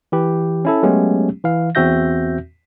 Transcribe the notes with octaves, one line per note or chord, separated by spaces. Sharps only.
E3 G4 B4
C#4 E4 A4
F#3 G#3 A3 B3 C#4 G4
E3 F5
E2 C4 F#4 E5 G6 A#6